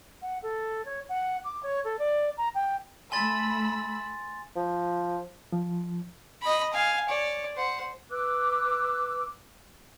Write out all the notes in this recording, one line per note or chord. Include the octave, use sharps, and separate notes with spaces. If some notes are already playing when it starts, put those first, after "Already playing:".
F#5
A4
C#5
F#5
D6
C#5
A4
D5
A#5
G5
A3 G#5 B5 C6 E6 A6
F3
F3
D#5 B5
F5 G#5
C#5 D5
C5 F#5
B4 D6 E6 F#6